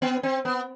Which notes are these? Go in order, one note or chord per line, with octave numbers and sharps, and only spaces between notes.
B3
C4
B3